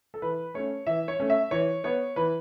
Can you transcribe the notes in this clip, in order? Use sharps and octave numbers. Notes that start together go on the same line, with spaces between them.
A4
E3 B4
A3 C#4 C#5
E3 E5
C#5
A3 C#4
E5
E3 C#5
B3 C#5
E3 B4